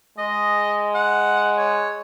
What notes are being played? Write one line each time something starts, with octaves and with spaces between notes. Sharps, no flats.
G#3 D#5
F#5
C#5